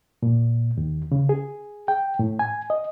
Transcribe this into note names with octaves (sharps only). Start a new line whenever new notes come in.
A#2
D#2
C#3
G#4
G5
A2
G#5
D#5